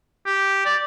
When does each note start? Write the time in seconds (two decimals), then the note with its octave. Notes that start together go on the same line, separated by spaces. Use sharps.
0.26 G4
0.65 D5